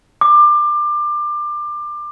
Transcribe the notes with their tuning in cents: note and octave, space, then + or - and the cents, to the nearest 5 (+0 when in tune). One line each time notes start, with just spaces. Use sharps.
D6 +25